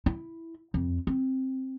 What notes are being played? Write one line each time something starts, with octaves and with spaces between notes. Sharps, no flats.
E4
F2
C4